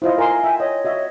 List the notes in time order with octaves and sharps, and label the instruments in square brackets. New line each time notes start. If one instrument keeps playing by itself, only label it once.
[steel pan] E4 F4 D#5 [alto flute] C5
[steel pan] A#4 C6 [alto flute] G#5
[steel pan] E5 G5
[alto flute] C#5 [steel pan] D#5
[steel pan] F#4 D#5 E5